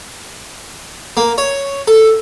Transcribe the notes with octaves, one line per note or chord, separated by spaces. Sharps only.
A#3
C#5
A4